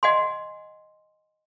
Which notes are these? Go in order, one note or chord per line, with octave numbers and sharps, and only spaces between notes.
D#5 F#5 G#5 C6